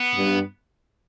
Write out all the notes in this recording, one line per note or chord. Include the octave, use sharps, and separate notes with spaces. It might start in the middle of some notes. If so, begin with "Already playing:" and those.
Already playing: B3
G2